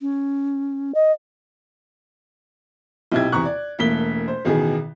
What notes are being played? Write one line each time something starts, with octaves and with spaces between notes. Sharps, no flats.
C#4
D#5
B1 C3 E4 G4 G#6
E2 C3 A#5 C#6 F#6
D5
E1 A3 A#3 B6 G7
C5
A1 B2 D#3 G#4